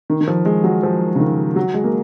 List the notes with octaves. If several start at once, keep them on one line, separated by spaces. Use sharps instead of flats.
D#3
D#3
F3
G#3
F#3
F3
C#3
D#3
F#3
G#3
A#3